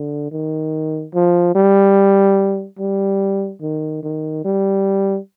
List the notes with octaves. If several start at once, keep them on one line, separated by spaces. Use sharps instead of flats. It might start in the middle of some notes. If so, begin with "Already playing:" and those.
Already playing: D3
D#3
F3
G3
G3
D#3
D#3
G3